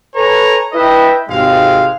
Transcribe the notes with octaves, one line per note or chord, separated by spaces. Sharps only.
A4 B4 C#5 G#5 A#5
E4 B4 D#5 E5 G5
G#1 C3 G#3 C4 F5